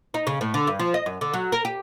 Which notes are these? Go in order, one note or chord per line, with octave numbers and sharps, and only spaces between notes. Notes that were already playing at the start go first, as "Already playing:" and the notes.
D#4
C#3
A2
D3
G2
F3
D#5
F#2
D3
F#3
A#4
G4